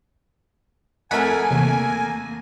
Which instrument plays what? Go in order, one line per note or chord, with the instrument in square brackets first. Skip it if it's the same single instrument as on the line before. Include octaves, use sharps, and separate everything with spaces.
[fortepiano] F2 A3 A#4 [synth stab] F#5 B5 [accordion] G#5
[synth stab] E2 C3 [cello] A#3